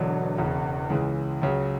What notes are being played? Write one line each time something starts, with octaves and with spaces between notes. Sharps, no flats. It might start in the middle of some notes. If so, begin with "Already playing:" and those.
Already playing: E1 E2 D3 F#3
E1 E2 C#3
C#2 C#3 E3 G#3
C#2 C#3 F#3